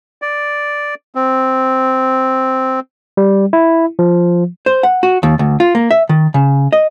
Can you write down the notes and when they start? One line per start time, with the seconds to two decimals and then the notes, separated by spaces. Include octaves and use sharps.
0.22 D5
1.15 C4
3.17 G3
3.53 E4
3.99 F3
4.66 C5
4.83 F#5
5.03 F#4
5.23 D#2
5.39 D2
5.60 F4
5.75 A#3
5.91 E5
6.09 D#3
6.34 C#3
6.73 D#5